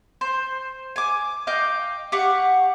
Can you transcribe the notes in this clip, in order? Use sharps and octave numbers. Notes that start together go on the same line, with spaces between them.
C5
G#5 D6
D#5 F5 G5 D6
G4 F5 F#5 C#6